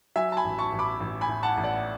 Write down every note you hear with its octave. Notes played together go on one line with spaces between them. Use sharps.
F#3 E5 G#5
A5
G#5 B5
A1
A5 C#6
A1
B5 D6
A1
G#5 B5
A2
F#5 A5
A1
D5 F#5